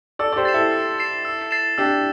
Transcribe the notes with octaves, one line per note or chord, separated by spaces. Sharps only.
A4 D5 E6
D5
G4 C5
A6 C7 E7
E4 A4
E6
A6 C7 E7
E6
A6 C7 E7
D4 G4 E6